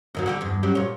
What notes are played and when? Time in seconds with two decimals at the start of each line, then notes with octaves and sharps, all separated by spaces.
0.15 D#2 D#3 F#3
0.26 D3 F#4 G4
0.41 E2 G2
0.63 F#2 F#3 G4
0.75 A#2 C#5